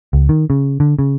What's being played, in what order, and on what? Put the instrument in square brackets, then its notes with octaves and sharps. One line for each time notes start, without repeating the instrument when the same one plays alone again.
[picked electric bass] C#2
D#3
C#3
D3
C#3